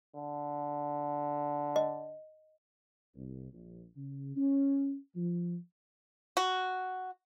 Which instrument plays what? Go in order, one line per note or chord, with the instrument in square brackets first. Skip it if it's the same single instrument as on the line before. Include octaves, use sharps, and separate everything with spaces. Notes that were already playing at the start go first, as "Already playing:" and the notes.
[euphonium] D3
[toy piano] D#5
[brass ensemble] C2
A#1
C#3
C#4
F3
[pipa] F#4